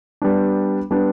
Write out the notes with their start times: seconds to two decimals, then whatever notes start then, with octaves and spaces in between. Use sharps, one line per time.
0.22 G3 B3 D4
0.91 G3 B3 D4